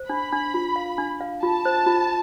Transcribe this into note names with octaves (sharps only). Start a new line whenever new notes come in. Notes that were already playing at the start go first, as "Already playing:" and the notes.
Already playing: C5
D4 B5
D4
F4
F5
D4
F5
F4 A5
C5
F4